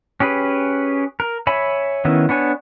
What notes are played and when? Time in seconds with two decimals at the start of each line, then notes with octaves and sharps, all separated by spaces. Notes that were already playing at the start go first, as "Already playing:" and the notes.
0.20 C#4 G4 G#4 B4
1.20 A#4
1.47 C#5 E5 G#5 B5
2.05 D#3 B3 C#4 E4
2.29 B3 D4 C#5 G#5